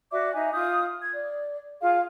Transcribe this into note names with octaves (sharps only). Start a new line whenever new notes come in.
F#4 D5 E5 D6
D#4 E5 G#5
F4 D#6 G6
G#6
D5
F4 G#4 F5